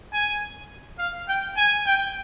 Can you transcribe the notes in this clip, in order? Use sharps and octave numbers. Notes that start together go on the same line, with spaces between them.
G#5
F5
G5
G#5
G5